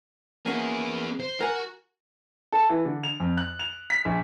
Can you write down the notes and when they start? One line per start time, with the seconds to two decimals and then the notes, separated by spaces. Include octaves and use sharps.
0.46 A#3 B3 C#4 F#4 G#4
1.20 C5
1.41 F#4 A#4 G#5
2.52 A4
2.69 E3
2.85 D3
3.03 F7
3.20 F2
3.37 F#6
3.59 F7
3.90 B6
4.05 A#1